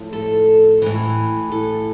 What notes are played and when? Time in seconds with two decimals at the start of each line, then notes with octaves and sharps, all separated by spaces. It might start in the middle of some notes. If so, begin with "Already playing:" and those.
Already playing: A2 F3
0.13 A4
0.82 A2 E3
1.52 A4